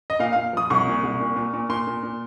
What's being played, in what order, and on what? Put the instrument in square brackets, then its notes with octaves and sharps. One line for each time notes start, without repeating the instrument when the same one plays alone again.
[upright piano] D#5
A#2 F5
A#2 F5
F3 D#6
C2 C#6
A#2
C2
A#2
A#2
A#2
A#2 C6
A#2
A#2